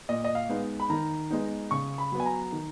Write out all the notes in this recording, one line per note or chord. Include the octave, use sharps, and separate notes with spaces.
A#2 D#5
D#5
F5
G#3 B3 D#4
B5
D#3 A#5
G#3 B3 D#4
C#3 C#6
B5
F#3 B3
G#5
A#5
D#3